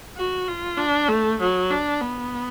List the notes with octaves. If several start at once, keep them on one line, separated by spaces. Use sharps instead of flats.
F#4
F4
D4
A3
F#3
D4
B3